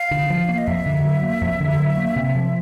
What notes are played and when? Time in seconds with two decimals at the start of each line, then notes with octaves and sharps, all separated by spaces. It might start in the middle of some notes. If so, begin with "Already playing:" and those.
Already playing: F5
0.11 D3
0.30 F3
0.49 A#3
0.58 D#5
0.67 F2 E5
0.86 D3
1.04 F#3
1.23 A#3
1.41 F2
1.60 D3
1.79 F#3
1.97 A#3
2.16 C3
2.35 F3